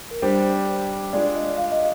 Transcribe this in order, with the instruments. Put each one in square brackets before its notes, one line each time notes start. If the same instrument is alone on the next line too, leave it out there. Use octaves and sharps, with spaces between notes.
[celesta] A#4
[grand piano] G3 D4 G4 [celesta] C5
[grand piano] G#3 D4 F4 G#4 [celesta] D5
[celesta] D#5
F5
D#5